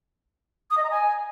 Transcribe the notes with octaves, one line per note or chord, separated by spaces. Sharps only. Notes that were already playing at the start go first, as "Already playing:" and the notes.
D#6
D#5
A#5
G#5